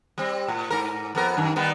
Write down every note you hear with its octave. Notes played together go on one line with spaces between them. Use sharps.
G3 C4
A2
G#2 A#4
F2 B3 A#4
F#2 D#3
D#3 G3 B3